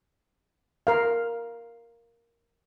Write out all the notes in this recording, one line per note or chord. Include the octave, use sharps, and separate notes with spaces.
A#4 F5